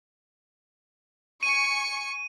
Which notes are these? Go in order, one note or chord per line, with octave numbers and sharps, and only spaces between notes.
G#5 C#6 C#7 D#7